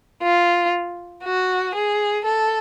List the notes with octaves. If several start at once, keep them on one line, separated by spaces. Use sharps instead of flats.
F4
F#4
G#4
A4